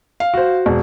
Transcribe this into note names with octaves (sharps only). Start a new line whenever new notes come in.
F5
F#4 C5
E1